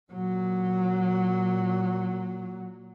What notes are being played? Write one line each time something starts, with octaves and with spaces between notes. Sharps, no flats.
A#2 F#3